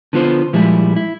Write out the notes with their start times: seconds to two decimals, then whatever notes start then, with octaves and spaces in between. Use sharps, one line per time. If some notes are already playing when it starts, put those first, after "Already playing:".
0.13 D3 B3 F4 C5
0.53 A#2 F3 G3 G#3 E4
0.96 E4